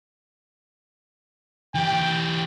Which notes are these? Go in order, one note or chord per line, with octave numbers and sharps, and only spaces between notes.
E3 G4 G5